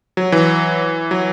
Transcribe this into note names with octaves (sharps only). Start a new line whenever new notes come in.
F#3
E3
F#3